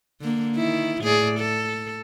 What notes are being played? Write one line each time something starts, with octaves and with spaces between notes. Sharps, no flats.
D3 A#3
D#3 E4
A2 G#4 D5
A4